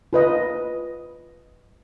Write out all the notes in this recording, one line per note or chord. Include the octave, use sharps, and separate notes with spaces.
F4 B4 D#5